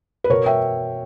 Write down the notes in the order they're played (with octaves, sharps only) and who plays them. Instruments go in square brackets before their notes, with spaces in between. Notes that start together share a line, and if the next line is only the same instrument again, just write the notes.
[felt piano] B4
B2 A#4 C#5
E5 G5